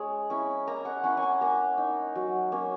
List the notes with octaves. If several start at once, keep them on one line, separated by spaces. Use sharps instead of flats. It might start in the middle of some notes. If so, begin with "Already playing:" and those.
Already playing: G#3 C#4
C#4 E4
A#3 A#5
F#5
C#4 E4 F#5
G#5
F#5
A#3 A#5
D#4
F#3
A#3 C#4